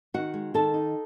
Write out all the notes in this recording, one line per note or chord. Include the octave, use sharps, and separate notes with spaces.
D#3 F#4 F#5
G#3
D#3 A4 A5
D#4